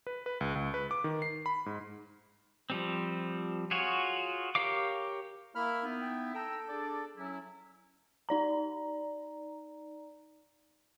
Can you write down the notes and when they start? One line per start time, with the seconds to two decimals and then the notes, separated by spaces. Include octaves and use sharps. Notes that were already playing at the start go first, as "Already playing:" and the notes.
0.07 B4
0.26 B4
0.41 C#2
0.55 C#2
0.74 B4
0.91 D6
1.04 D#3
1.22 C7
1.46 B5
1.66 G#2
2.70 F3 G3 C4
3.71 F4 F#4 G#4 C#5
4.55 G4 A#4 C#5 F5 D6
5.55 A#3 E4 B5 F6
5.83 B3 D#4 E4
6.01 G5
6.35 A4 G5 A#5 E6
6.68 D4 G#4 D5
7.17 F#3 C#4 E4
8.29 D#4 D5 A#5